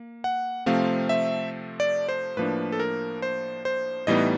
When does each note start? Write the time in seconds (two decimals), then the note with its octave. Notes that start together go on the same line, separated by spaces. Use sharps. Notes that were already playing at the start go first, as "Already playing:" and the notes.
Already playing: A#3
0.24 F#5
0.66 C3 F3 A3 C4 F5
1.09 E5
1.80 D5
2.09 C5
2.37 A2 F3 A#3 D4 B4
2.72 A4
2.80 A#4
3.22 C5
3.65 C5
4.07 A2 E3 G3 B3 D#4 D#5